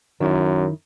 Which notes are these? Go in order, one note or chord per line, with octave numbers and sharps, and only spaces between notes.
F#2 D#3 E4